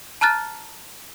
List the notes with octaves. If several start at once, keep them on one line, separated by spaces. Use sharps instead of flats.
A5 A#5 F6 F#6 A6